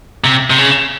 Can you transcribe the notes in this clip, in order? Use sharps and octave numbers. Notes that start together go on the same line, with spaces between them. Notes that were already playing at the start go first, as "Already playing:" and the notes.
C3
C3
C#3